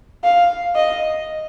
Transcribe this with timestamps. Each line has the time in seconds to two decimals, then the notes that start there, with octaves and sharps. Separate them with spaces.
0.24 F5
0.75 D#5